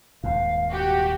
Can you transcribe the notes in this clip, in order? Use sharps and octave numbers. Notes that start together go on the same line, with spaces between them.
D#1 G#2 F5
F#4 G4 G5